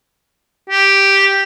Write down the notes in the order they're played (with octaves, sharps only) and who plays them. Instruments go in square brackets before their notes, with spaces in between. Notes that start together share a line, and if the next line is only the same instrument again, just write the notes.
[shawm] G4